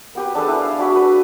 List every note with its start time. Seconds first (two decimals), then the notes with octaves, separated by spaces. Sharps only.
0.15 B3 G4 B4
0.35 D4 G#4 A4 B4
0.48 E4
0.62 F5
0.79 D4 F#4 B5
0.95 B4